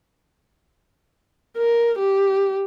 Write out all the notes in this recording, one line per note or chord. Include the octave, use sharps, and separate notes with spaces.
A#4
G4